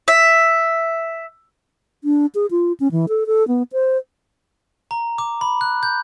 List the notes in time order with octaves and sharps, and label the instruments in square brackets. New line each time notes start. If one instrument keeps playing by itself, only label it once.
[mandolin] E5
[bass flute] D4
G#4
F4
C#4
E3
A4
A4
B3
C5
[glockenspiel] A#5
D6
B5
F#6
G6